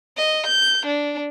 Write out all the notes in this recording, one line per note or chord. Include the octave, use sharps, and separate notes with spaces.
D#5
G6
D4